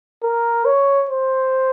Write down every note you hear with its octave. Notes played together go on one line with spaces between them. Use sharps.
A#4
C#5
C5